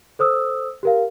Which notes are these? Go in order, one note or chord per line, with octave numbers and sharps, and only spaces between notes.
A4 C5 D#6 E6
G4 A#4 F5